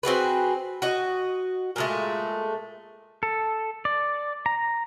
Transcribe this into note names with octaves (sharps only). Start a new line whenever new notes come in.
C4 F#4 G#4 B4
F#4 D#5
A#2 G#3 A3
A4
D5
A#5